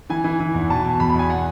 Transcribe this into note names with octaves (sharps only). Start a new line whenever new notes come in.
E3 G#5
E3
E3
E2
B2 A5
B2
E2 B5
B5
E2
G#5
F#5